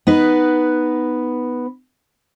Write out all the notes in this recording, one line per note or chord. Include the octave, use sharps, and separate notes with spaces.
B3 D#4 B4